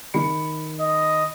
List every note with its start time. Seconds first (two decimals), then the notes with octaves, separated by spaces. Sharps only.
0.14 D#3 B5 C#7
0.80 D#5